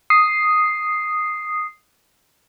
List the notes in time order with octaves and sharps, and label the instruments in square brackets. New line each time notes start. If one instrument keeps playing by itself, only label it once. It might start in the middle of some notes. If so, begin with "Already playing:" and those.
[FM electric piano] D#6 C7